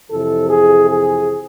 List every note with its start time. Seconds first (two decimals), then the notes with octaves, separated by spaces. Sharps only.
0.10 F2 C3 E3 A4
0.50 G#4
0.90 G#4